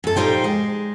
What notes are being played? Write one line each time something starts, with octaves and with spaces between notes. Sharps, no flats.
F#2 A4
A#2 G3 D#4 C5 G5
G#3